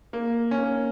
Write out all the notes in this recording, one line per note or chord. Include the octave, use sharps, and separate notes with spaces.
A#3
C#4
A#3